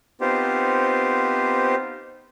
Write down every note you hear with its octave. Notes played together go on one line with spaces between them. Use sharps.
B3 C4 D#4 F4 G4 C5